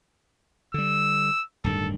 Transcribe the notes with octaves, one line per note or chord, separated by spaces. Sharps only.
D3 G3 E6
D1 G2 D#3 A4